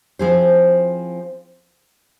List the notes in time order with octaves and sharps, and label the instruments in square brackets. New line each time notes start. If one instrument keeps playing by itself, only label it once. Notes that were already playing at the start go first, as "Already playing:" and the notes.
[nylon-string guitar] F3 C4 E4 G#4 C5